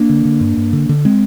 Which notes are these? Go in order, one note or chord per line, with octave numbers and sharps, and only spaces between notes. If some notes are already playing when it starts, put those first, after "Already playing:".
Already playing: A#3 D4
D3
D3
G2
G2
D3
D3
G#3 C4